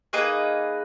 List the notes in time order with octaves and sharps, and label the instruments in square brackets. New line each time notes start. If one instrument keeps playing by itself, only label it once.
[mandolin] A#3 D#4 G#4 B4